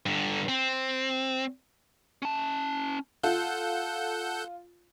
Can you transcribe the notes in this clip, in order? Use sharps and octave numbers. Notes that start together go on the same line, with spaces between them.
G2 D3
C4
C#4 A5
F4 A4 F#5 G6